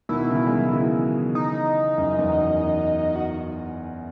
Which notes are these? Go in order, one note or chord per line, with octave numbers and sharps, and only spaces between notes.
B2 D#3 E4
C#3 E3
G#3
D#3 F#3
C#3 E3
D#4
F#2
E2
F#2
F#4